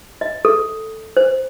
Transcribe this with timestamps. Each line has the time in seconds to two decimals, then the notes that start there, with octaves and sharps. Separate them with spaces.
0.21 D#5
0.45 A4
1.17 C5